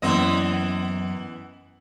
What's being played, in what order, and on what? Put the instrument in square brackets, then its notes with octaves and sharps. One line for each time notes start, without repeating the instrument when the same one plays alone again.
[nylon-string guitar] F#2 A#3 D5 [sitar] E3 B3 D#5